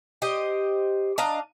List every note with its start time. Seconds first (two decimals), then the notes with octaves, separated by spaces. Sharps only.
0.22 G4 C5 D#5
1.18 D4 D#5 F5 A#5